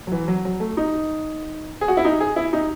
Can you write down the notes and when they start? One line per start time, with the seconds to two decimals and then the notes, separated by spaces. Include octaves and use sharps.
0.07 F#3
0.12 E3
0.28 F#3
0.45 F#3
0.60 A3
0.77 D#4
1.81 G#4
1.88 F#4
1.97 E4
2.05 D#4
2.21 G#4
2.36 E4
2.53 D#4